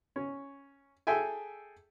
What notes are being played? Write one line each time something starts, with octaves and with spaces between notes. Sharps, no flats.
C#4
G#4 A4 E5 G5 G#5